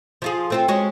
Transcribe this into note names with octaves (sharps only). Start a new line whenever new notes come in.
F3 F4 G#4
A3 C4 F4
G#3 C#4 F#4